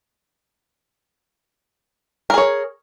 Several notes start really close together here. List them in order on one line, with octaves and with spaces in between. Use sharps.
A#4 G#4 C#5